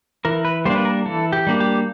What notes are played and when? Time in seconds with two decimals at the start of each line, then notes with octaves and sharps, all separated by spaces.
0.25 E3 A#4
0.45 B4
0.65 G3 A#3 D4 C5
0.76 B4
0.85 A#4
1.06 E3 A4
1.33 G4
1.47 G3 A#3 D4
1.60 G4